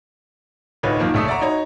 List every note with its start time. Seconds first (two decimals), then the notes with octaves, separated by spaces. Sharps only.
0.83 D1 D2 D#4 F4 B4 C#5
0.99 F#2 D#3 F3 A#3
1.14 A#1 C#3 A3 C#6 D#6 E6
1.28 D5 E5 F#5 A#5 C#6
1.41 D#4 F#4 C#5 D#5 A#5 B5